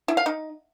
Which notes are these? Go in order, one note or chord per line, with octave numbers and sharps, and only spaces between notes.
E4
F5
D#4